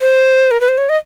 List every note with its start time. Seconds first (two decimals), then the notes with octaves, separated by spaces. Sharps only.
0.01 C5
0.51 A#4
0.61 B4
0.69 C5
0.78 C#5
0.89 D#5